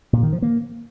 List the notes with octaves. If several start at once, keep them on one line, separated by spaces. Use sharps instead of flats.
A#2
D#3
F3
A#3